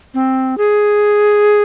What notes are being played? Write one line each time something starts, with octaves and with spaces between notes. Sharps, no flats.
C4
G#4